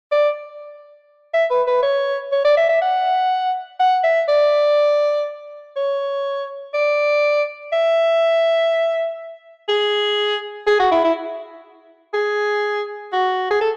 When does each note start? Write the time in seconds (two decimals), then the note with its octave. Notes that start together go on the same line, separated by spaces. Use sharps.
0.12 D5
1.34 E5
1.51 B4
1.67 B4
1.83 C#5
2.32 C#5
2.45 D5
2.57 E5
2.69 E5
2.82 F#5
3.80 F#5
4.04 E5
4.29 D5
5.76 C#5
6.74 D5
7.73 E5
9.69 G#4
10.67 G#4
10.80 F#4
10.92 E4
11.04 E4
12.14 G#4
13.13 F#4
13.51 G#4
13.61 A4